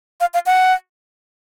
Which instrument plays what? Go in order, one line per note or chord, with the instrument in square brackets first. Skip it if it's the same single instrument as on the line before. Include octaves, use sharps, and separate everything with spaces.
[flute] F5
F5
F#5